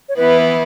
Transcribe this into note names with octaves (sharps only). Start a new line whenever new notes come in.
C#5
E3 B3 E4 B4